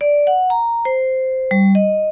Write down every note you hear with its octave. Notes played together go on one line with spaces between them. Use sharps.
D5
F#5
A#5
C5
G3
D#5